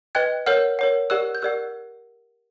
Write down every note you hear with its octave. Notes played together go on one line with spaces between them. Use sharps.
B4 D#5 G5 F#6 G#6
A#4 C#5 F#5 F6 G6
A#4 C#5 F#5
G4 A#4 D5 F#5 E6 F#6
G6
G4 A#4 D5 F#5 E6 F#6